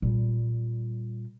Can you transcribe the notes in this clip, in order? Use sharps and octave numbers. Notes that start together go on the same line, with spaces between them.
A#2 G3